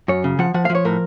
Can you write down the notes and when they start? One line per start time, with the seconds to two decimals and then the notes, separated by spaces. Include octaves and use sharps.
0.08 F#2 C#5
0.24 C#3
0.39 F3 F#5
0.54 F3 F#5
0.65 F5
0.70 F3
0.75 C#5
0.85 A2 A#4